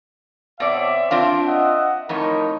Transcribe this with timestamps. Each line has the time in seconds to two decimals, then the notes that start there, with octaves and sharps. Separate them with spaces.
0.60 B2 C4 C#5 D5 E5
1.11 C4 D4 F4 F5
1.46 D#5 E5 F#5
2.09 F2 A2 D#4 A#4 C#5